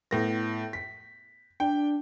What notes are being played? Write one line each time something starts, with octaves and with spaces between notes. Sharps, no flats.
A2 B3 A#6
B6
D4 G5